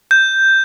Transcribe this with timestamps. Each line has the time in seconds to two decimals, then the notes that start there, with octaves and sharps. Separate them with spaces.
0.11 G6